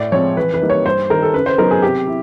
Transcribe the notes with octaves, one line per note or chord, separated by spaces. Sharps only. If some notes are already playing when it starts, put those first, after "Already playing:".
Already playing: A2 D5
F3 G#3 C4 C#5
E3 B4
B4
G3 A#3 D#4
C#5
G2 C5
D#3 G3 A#4
A4
C#3 B4
C5
F#3 B3 D#4 A#4
G#4
C3 G4
E4